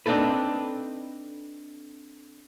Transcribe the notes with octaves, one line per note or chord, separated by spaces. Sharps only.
C4 D4 D#4 A4 B4